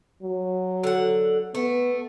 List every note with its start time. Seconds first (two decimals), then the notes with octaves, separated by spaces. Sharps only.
0.23 F#3
0.83 D3 F#5
1.55 A3 B3